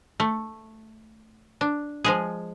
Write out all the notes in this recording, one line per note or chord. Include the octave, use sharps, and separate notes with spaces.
A3
D4
F3 G#3 G#4